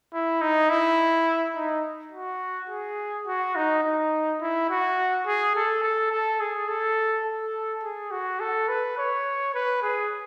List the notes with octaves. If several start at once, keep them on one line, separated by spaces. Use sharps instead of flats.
E4
D#4
E4
D#4
F#4
G#4
F#4
D#4
D#4
E4
F#4
G#4
A4
A4
A4
G#4
A4
A4
G#4
F#4
A4
B4
C#5
B4
G#4